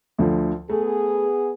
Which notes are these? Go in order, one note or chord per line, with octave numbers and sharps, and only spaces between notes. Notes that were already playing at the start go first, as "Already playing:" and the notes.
D2 D3 F3
A3 B3 G#4